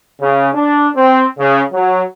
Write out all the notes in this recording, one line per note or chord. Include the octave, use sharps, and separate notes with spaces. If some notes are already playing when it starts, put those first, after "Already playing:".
C#3
D4
C4
C#3
F#3